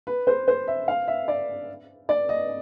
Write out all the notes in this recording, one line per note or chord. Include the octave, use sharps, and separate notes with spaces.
B4
C5
C5
E5
F5
E5
D5
D5
D#5